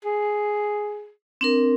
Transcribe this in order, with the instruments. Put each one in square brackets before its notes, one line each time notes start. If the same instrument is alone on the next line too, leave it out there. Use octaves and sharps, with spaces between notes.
[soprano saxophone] G#4
[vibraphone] C4 D4 A#4